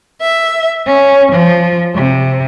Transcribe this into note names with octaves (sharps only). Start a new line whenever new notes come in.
E5
C#4
F3
C3